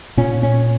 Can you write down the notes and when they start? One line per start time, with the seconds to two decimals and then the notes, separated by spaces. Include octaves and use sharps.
0.17 A#2 C#4
0.43 C#4